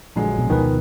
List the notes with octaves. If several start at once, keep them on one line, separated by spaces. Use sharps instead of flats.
A#1 F#2 D3 G#3
B2
D2 B2 D#3 F3 B4